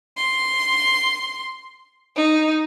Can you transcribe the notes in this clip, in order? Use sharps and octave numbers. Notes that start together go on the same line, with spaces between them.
C6
D#4